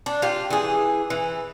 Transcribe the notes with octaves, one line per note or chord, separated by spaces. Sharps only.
D4
F4 G4
E3 G#4
E3